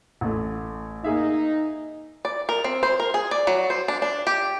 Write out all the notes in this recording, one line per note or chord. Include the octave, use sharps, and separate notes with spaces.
A1 A3
A#3 D#4 G#4 E5
D5
A#4
C4
C5
A#4
G#4
D5
F#3
C5
D4
D4
G4